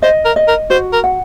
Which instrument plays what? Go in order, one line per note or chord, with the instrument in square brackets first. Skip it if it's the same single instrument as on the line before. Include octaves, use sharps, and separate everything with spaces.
[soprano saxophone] C5 [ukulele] D#5
[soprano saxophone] A#4
[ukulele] D#5
[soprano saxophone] A#4
[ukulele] F#4 [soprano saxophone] C5
[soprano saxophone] A#4
[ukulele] F#5